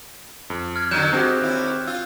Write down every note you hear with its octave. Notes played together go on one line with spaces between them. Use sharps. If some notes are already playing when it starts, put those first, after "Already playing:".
F2
F6 G#6
D3 D#3 F#3 F#6 G6 E7
G#3 C4 F#4 G4
D#2 E4
F4 E6